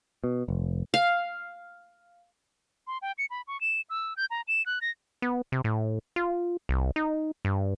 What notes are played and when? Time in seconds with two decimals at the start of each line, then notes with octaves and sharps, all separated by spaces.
0.24 B2
0.48 F1
0.94 F5
2.87 C6
3.02 G5
3.18 C#7
3.30 B5
3.47 C#6
3.61 E7
3.90 E6
4.17 G6
4.31 A#5
4.48 E7
4.66 F#6
4.82 A#6
5.22 B3
5.52 C3
5.64 A2
6.16 F4
6.69 C2
6.96 D#4
7.45 G2